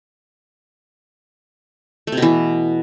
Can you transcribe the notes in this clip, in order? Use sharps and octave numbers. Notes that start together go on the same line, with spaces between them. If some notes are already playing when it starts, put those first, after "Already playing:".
A3
C3
B2
E3